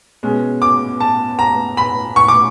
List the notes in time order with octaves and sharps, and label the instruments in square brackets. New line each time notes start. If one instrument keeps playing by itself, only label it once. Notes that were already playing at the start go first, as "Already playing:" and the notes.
[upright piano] B2 G#3 C#4
D6
A5
A#5
B5
C#6
D6